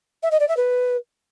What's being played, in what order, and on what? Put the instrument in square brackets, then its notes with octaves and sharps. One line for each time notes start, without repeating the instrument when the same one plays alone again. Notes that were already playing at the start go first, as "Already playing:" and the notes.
[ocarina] E5
D#5
D5
E5
B4